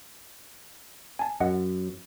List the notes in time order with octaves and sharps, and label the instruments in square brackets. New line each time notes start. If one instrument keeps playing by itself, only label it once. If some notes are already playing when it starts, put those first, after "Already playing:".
[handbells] G#5 A5
[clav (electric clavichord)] F#2 [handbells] D#5 F#5